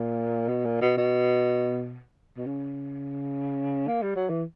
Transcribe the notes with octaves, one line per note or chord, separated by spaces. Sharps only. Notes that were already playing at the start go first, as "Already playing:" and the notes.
Already playing: A#2
B2
A#2
B2
B2
B2
C#3
A#3
G3
F#3
E3